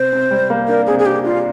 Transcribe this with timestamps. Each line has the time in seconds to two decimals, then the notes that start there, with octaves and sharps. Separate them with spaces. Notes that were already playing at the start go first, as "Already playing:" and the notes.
Already playing: C3 C5
0.12 C3
0.31 G3
0.50 A#3
0.68 D4 A#4
0.87 C3 G#4
0.99 G#4
1.06 D4 G4
1.24 D4 F4